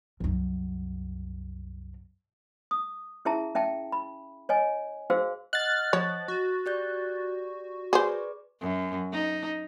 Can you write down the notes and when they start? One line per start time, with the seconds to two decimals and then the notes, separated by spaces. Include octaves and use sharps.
0.20 C2 F#2
2.71 D#6
3.25 C#4 E4 G#4 E5 A5 A#5
3.55 C#4 E5 G5 A5
3.92 B5
4.49 C#5 D#5 G#5
5.10 F#4 G#4 C5 F5 E6
5.53 D#5 F#5 F6 F#6 A6
5.93 F3 C#5
6.28 F#4
6.66 G4 D5 G6
7.93 G#4 B4 C5 D5 D6
8.61 F#2
9.12 D#4